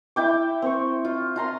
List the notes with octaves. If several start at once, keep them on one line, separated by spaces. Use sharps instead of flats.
E4 G5 D6
C4 C#6
F4
F4 A#5 C6